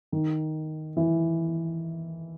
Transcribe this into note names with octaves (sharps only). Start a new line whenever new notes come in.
D#3
E3